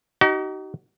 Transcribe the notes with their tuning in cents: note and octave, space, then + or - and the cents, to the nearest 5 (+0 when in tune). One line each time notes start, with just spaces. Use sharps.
D#4 +0 F#4 +45